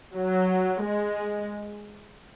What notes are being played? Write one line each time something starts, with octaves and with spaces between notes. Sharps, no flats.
F#3
G#3